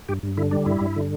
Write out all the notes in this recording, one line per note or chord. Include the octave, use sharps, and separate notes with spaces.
G2 G4
G2
D3 E4
G3 D4
G2 E4
G2
D3